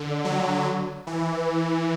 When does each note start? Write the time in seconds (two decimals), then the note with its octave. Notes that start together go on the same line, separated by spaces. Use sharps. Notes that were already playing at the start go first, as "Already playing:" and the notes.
Already playing: D3
0.25 F#3
1.07 E3